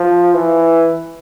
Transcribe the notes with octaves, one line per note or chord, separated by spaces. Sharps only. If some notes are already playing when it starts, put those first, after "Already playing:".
Already playing: F3
E3